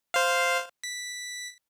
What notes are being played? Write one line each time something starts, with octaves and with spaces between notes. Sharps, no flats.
C5 F5
B6